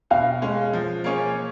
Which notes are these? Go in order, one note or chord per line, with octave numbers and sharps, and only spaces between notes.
B2 F5
G#3 C#4
F3
A#3 C#4 G#4 C#5